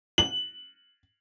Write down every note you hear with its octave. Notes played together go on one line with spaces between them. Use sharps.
F#7